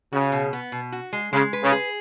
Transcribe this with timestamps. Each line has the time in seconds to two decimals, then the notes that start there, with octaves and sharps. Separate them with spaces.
0.13 C#3 F#4
0.32 B2
0.53 B3
0.72 B2
0.92 F#4
1.13 G#3
1.32 C#3 G#3
1.53 B4
1.63 C#3
1.72 G#4